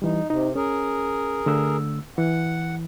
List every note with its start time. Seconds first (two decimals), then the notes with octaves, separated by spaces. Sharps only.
0.02 E3 G3 D#4
0.30 C3 D#4
0.55 C#4 G#4 A#4
1.46 D3 A3 E6
2.18 E3 F#5